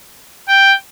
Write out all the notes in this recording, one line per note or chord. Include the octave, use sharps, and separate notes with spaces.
G5